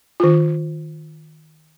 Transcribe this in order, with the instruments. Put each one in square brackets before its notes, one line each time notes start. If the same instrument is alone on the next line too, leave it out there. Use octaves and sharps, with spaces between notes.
[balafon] D#3 F4